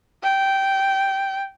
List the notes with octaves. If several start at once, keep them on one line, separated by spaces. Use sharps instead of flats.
G5